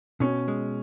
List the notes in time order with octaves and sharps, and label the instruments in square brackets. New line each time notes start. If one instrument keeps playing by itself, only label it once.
[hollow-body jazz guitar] B2 [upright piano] C#4
[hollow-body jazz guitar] G#3